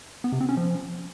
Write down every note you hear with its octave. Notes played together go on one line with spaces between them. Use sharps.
B3
C3
C4
C#4
F3